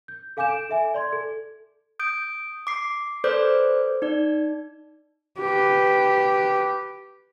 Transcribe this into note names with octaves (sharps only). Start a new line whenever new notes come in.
G6
A4 F5 G#5 D6 G6 E7
D7 E7
A4 E5 G#5
D5 C6 G#6
A4
D#6 G6 D7
D6 C7
A4 B4 C5 D5 D6 G6
D#4 D5
G4 B4